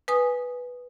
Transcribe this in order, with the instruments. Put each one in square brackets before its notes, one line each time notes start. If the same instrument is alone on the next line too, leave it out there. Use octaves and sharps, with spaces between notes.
[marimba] B4 G#5 D#6